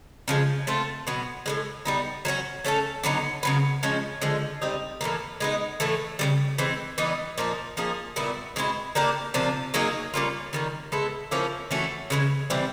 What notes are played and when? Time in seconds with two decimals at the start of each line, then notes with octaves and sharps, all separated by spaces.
0.28 C#3 F3 G#3
0.67 A3 C4 F4
1.07 B2 F#3 B3
1.46 A2 E3 G#3
1.85 G3 B3 D#4
2.25 F#3 A3 C#4 F#4
2.64 A3 C#4 F4 A4
3.03 D3 F#3 B3 D#4
3.43 C#3 F#3 B3
3.83 F3 G#3 C#4
4.22 D3 F3 G#3
4.62 G3 C4 D#4
5.01 A2 E3 G3 A#3
5.40 G#3 B3 D#4
5.80 A2 E3 A3
6.19 C#3 E3 G3
6.58 E3 G#3 C4
6.98 E3 G3 B3 D#4
7.38 A#2 F3 A#3 D#4
7.77 F3 A#3 D#4 G#4
8.16 A#2 G3 B3 E4
8.56 B2 G#3 C4 E4
8.95 A#3 D4 G4 A#4
9.34 C3 F3 A#3 D4
9.74 F#3 A#3 D#4 G#4
10.14 G3 A#3 C#4 F4
10.53 D#3 G3 A#3
10.92 G#3 B3 E4 A4
11.31 F3 A#3 C#4 E4
11.71 E3 A3 C#4 F#4
12.10 C#3 E3 G#3
12.50 C3 E3 G3 C4